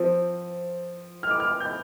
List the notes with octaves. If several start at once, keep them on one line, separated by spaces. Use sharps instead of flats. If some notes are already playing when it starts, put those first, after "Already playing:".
Already playing: F3 C4
F6
D6
F6
G6